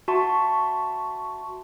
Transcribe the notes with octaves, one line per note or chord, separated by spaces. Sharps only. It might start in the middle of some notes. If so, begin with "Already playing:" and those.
F#4 E5 A5 C6 C#6